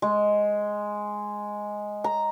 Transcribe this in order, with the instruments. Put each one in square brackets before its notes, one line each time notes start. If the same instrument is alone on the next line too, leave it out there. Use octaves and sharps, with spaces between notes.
[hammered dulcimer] G#3
A#5